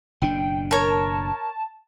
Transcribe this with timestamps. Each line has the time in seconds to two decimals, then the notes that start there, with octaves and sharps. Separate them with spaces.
0.22 F#1 B2 D4 G5
0.71 A#4 C#5 A5